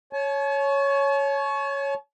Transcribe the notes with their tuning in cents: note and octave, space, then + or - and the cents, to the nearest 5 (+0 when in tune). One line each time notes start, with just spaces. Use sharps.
C#5 +0 A5 -45